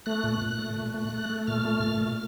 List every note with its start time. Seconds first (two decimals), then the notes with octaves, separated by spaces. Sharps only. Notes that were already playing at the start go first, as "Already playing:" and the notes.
0.06 A3 F#6
0.24 A#2
0.42 A#2
0.59 A3
0.76 A#2
0.94 A3
1.13 A3
1.30 A3
1.47 A#2 F6
1.65 A3
1.84 A#2
2.01 A#2